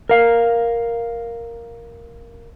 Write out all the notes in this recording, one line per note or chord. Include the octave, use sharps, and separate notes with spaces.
A#4 F5